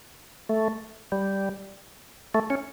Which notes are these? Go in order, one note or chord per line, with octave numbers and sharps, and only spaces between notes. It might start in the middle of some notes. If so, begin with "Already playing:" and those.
A3
G3
A3
C#4